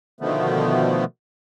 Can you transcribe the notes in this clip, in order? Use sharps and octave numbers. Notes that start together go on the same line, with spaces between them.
B2 D3 D#3 F3 A3 B3